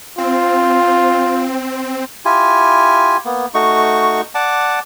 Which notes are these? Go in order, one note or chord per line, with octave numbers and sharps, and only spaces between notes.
C4 F4
E4 F4 G4 G#5
A#3 B3
A3 D#4 F#4 C#6
D5 F#5 A5 D6